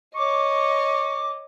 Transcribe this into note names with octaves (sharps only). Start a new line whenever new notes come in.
C#5 D#5 C#6 D6